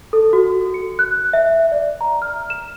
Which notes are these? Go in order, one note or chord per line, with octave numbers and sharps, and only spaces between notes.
A4
F#4
C#7
F#6
E5
D5
A#5
F6
E7